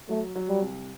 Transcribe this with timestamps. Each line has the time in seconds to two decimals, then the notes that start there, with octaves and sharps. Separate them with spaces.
0.09 F#3 A3
0.35 F#3
0.49 G3
0.62 C2